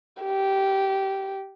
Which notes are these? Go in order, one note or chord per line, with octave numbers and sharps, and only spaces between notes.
G4